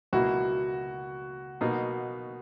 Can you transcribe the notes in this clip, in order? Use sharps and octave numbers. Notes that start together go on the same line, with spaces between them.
C#2 B2 A#3 E4 F#4
B2 A#3 D#4